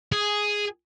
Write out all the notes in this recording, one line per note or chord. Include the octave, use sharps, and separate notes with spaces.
G#4